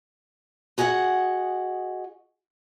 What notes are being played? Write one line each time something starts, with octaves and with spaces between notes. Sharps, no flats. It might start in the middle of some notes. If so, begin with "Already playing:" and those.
F#4 G#4 D#5 F5 F#5